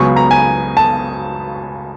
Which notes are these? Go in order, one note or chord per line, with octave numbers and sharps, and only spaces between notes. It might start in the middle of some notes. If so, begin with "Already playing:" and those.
Already playing: C#2 C#3 F#3 B3 C#6
A#5
G#5
A5